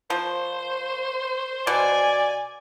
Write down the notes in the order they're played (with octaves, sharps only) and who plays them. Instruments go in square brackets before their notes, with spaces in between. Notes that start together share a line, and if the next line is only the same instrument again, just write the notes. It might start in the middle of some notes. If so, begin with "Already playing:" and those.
[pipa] F3 [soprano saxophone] C5
[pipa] B2 [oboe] D5 [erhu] G#5